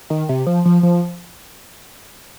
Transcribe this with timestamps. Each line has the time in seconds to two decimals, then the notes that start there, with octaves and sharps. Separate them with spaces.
0.10 D#3
0.29 C3
0.47 F3
0.65 F3
0.83 F3